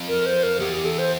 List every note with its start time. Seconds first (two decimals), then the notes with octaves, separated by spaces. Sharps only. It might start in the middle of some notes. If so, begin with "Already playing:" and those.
Already playing: F2
0.08 A#4
0.26 C5
0.43 A#4
0.60 E2 G4
0.73 G4
0.85 A4
0.99 C5